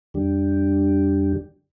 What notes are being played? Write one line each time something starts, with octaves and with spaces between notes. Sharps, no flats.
F2 D3 G3 D4 G4